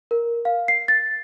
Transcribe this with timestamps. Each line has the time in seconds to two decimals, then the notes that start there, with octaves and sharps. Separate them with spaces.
0.11 A#4
0.45 F5
0.68 C7
0.88 A6